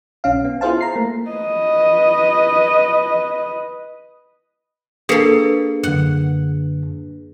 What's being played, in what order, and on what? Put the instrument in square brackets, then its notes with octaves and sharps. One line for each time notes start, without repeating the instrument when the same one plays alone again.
[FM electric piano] B1 C#4 F5
B3
E4 F4 G#4 C5 F5 A5
A#5 C7
A3 A#3
[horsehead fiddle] B4 D#5
[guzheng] A#3 A4 [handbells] D4 G#4 B4
[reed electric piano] F#2 D3 [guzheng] F#5